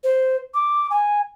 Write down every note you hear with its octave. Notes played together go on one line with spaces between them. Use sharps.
C5
D6
G#5